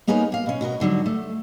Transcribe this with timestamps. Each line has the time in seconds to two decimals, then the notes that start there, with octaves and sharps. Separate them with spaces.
0.07 A#3 B3 D#4 G#4 A#4 C#5
0.32 A#3 F5
0.46 B2 C#4
0.61 B2 F#4 A#4 D#5
0.80 G#2 D3 F#3 G3
1.06 A3